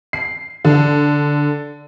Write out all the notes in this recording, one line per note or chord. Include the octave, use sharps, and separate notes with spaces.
C7
D3